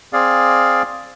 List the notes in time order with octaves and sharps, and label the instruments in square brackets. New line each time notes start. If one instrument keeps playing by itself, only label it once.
[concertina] C4 G#4 D5 F5